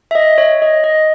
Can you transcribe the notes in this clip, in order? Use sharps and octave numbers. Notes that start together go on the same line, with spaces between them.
E5
D#5
C#5
D#5
D#5